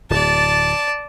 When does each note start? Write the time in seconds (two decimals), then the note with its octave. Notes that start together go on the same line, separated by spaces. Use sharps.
0.10 D1 D5 A5